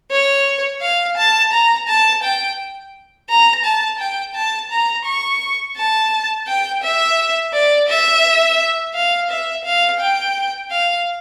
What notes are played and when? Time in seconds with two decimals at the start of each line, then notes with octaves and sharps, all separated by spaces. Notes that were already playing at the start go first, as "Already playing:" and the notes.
0.11 C#5
0.82 F5
1.17 A5
1.52 A#5
1.88 A5
2.23 G5
3.29 A#5
3.65 A5
3.99 G5
4.34 A5
4.71 A#5
5.06 C#6
5.77 A5
6.47 G5
6.83 E5
7.53 D5
7.89 E5
8.95 F5
9.30 E5
9.65 F5
10.00 G5
10.71 F5